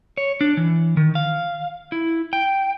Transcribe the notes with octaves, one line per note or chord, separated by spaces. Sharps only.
C#5
D4
E3
D#3
F5
E4
G5